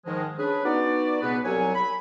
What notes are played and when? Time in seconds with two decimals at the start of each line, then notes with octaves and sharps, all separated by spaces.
0.06 G#2 D#3 F3 G#3
0.38 C#4 D4 G#4 B4
0.65 B3 D#4 F#4 D5
1.22 C#2 B2 B3 B4
1.45 C2 F#3 C#5 G#5
1.75 B5